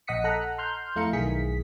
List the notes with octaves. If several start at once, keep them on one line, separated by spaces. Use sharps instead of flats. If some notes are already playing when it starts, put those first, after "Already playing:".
A#1 D#5 F#5 D#6 B6 C#7
A4 F#5 A#5 F#6
C6 F6 G6
F2 A3 E4 F5 A#5 C#7
B1 D#3 E3 G#4 B6